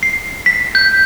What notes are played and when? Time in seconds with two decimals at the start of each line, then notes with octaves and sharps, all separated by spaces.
0.03 C7
0.46 B6
0.75 G6